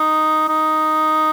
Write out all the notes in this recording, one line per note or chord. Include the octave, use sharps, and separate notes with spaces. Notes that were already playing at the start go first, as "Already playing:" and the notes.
Already playing: D#4
D#4